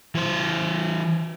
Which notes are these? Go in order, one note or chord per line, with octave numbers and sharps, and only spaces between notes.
E3 C5